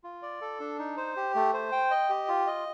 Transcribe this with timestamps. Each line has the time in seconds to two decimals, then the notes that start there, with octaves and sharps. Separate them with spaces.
0.04 F4
0.22 D5
0.41 A4
0.60 D4
0.79 D#4
0.97 C5
1.16 G4
1.35 A3
1.53 C5
1.72 G5
1.91 D#5
2.09 G4
2.28 F4
2.47 D#5